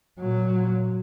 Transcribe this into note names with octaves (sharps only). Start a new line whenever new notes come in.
A#2 F#3